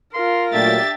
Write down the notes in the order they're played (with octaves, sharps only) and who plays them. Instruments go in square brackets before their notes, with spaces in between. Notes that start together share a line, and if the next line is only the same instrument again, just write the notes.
[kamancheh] F4 A#4 [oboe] C6
[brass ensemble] A#2 F#3 A3 [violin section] D4 G4 A6 [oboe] E5